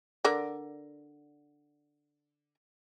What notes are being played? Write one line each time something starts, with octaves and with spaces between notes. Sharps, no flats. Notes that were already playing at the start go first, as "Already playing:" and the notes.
D3 A#4 D5